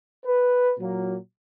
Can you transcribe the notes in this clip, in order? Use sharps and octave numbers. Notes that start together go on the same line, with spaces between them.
B4
A#2 F#3 A#3